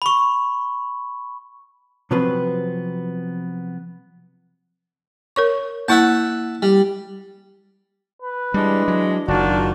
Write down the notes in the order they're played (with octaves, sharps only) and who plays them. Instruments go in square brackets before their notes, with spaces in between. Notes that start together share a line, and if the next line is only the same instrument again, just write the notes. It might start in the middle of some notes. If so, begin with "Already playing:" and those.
[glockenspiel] B5 C#6
[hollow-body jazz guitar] C3 F3 F#3 B3 C4 B4
[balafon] A#4 C#5 C#6
[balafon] A#3 E4 [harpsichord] E5 F#5 A5
[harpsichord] G3
[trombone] B4
[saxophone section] E3 G#3 D4 [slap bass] G3
[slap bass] F#3
[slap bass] F#1 [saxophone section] D#3 F4 F#4 [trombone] D4